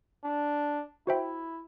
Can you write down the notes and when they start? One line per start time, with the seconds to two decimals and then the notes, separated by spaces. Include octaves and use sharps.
0.24 D4
1.07 E4 F#4 C5 E5 G5